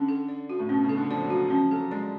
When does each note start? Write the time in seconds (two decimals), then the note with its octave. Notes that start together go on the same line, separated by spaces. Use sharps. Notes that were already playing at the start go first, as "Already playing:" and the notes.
Already playing: D3 C#4
0.09 A4
0.29 D5
0.50 F#4
0.59 A2
0.69 B2 C#4
0.84 C#3
0.89 A4
0.97 D3
1.11 F3 D5
1.24 F#3
1.30 F#4
1.46 F#3
1.50 F3 C#4
1.71 F#3 A4
1.91 G#3 D5